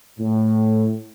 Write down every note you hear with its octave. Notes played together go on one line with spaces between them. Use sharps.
A2